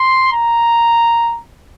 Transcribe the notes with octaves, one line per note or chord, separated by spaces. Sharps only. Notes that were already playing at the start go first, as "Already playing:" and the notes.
Already playing: C6
A#5